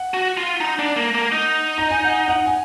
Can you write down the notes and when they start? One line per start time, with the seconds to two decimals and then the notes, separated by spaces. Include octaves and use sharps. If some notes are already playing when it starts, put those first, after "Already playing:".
Already playing: F#5
0.14 F#4
0.37 F4
0.60 D#4
0.79 D4
0.96 A#3
1.15 A#3
1.32 D#4
1.78 A#5
1.90 G#5
2.04 F#5
2.28 F#5
2.46 G#5